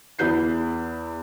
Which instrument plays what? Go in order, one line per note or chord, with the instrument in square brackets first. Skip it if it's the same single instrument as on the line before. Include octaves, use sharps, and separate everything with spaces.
[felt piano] E2 E4 B4 G6 C7